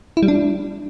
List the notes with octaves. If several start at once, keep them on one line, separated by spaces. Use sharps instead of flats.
E4
G3
D4